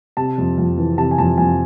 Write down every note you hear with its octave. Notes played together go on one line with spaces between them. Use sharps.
C3 A5
F2
F2
E3
C3 A5
G#5
F2 A5
F2 G#5